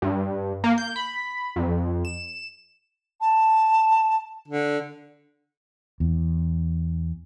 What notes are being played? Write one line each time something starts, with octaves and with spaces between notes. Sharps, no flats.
G2
A#3
G6
B5
F2
E7
A5
D3
E2